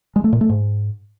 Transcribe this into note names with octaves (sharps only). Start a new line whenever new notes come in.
G#3
A3
A#2
A3
G#2